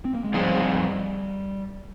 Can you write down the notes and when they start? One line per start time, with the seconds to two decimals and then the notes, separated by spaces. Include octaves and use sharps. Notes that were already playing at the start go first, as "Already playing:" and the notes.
0.05 C4
0.15 A#3
0.24 G#3
0.34 F3 G3 C4 D#4 G#4